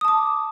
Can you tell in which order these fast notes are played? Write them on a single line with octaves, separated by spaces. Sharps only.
D#6 A5 D6